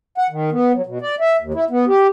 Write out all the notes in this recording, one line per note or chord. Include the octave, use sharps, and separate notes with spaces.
F#5
D#3
B3
F#3
B2
D5
E5
D#2
E4
B3
G4